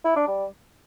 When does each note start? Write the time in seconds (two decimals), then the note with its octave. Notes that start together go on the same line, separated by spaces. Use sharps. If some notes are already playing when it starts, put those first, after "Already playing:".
0.05 E4
0.16 D4
0.28 G3